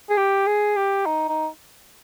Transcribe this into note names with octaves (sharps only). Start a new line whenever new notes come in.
G#4
G4
G#4
G4
D#4
D#4